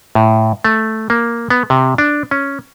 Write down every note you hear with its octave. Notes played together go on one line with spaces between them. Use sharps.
A2
A3
A#3
B3
C3
D4
C#4